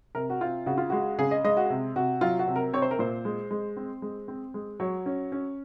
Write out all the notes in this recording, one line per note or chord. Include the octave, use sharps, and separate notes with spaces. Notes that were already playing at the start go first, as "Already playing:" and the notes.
C3 A#4
F#4
C4 F4
C#3 F#4
F4
G#3 F#4
C#3 G#4
D#5
G#3 D#5
F#4
C3
C3 F#4
F#3 F4
F#4
C3
A#4
C4 C#5
C5
A#4
A#2 C5
G#3
G#3
C4
G#3
C4
G#3
F#3 C#5
C#4
C#4